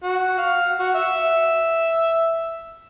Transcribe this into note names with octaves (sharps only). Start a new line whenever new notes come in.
F#4
F5
F#4
E5